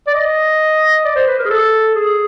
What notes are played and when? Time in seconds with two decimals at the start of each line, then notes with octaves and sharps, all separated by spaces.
0.07 D5
0.14 D#5
1.05 D5
1.16 C5
1.27 B4
1.39 A#4
1.45 G#4
1.50 A4
1.95 G#4